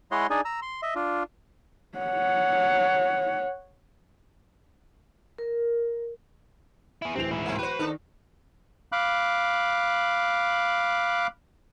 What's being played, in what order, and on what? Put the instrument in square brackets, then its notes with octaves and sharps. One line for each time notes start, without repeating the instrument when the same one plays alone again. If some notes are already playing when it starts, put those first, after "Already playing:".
[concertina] G#3 E4 C#5 D#5 F#5 C6
D4 D#4 G#4 D5 G#5
A#5 E6
C6
D#5 E5
D4 F4
[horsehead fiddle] C#5 F#5
[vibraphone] A#4
[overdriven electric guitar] E4 G#4
[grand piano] D1 E3 F7 [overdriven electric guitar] C4
[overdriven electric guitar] G#2 E4
[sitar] A3 C4
[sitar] F#4 C5 [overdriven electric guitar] B4
[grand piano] D#3 [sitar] D4 D#4 A4
[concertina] F5 B5 D6 F#6